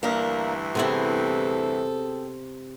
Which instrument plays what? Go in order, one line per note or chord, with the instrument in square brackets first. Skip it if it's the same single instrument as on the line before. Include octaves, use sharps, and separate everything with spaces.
[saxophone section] D2 G2 E3 [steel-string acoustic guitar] A#3 D4 A#4
[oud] C3 B3 E4 [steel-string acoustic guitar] C4 G#4 [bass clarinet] A4